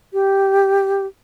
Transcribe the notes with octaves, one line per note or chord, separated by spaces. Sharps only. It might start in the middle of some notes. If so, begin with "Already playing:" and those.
G4